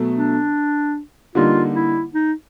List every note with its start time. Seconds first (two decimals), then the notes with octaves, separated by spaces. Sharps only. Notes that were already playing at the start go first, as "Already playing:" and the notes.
Already playing: B2 F#3 A3
0.17 D4
1.35 D3 G3 A#3 D#4 F4
1.75 E4
2.14 D#4